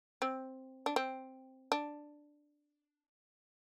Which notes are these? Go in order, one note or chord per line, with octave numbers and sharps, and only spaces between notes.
C4
D4
C4
D4